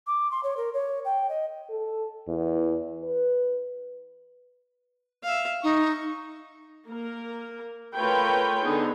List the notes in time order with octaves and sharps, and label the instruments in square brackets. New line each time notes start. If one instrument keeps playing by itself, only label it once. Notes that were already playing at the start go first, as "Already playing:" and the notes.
[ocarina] D6
C6
C#5
A#4
C#5
G5
D#5
[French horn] A4
E2
B4
[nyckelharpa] E5 F5
[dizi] D#4 [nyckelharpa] C#6
[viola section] A#3 A#4
A3 F4 A#4 B4 C#5 G5
D3 B3 D#4 G#4